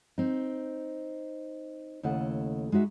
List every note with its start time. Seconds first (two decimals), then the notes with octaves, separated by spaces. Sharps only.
0.18 C4 D#4
2.03 D#2 C#3 A3 E4 D#5 F#5
2.72 G#3 D#4 F#4 E5